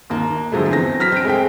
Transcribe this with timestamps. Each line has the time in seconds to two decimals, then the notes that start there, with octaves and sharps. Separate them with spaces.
0.10 D#2 A#3
0.52 D3 F3 F#3 G#3 A3
0.69 E2 C4 A#6
0.99 F#3 F6 A#6 B6
1.12 C4 D7
1.25 G#3 A3 C4 G5